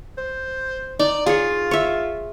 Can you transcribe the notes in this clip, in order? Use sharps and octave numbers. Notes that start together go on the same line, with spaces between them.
C5
D#4 D5
F4 G#4 C#5
C#5 E5